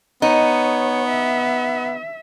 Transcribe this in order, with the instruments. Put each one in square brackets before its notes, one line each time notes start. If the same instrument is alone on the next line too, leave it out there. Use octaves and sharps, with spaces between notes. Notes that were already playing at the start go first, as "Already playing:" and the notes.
[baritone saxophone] B3 [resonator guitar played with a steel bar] D#4 [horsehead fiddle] C#5
[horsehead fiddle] E5